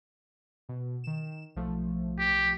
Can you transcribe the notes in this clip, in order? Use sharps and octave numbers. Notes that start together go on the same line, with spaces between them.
B2
D#3 E7
B1 F3 A3
G4